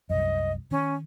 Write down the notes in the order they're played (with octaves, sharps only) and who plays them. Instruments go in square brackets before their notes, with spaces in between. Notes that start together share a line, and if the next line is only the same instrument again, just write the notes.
[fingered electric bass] C2 F#2 [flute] D#5
[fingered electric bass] D#3 [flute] C#4